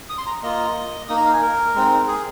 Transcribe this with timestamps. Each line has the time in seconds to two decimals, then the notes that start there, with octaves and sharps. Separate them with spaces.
0.10 D#6
0.18 C6
0.26 A#5
0.43 A#3 F4 D#5
1.09 A#3 D#4 D#6
1.17 A#5
1.25 F5
1.33 G#5
1.42 A#4
1.75 G#3 C4 D#4
2.07 G#4